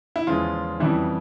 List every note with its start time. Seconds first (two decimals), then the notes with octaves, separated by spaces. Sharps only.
0.16 E4
0.27 E2 C#3 F3 G#3 F4
0.80 F2 C#3 E3 G3 E4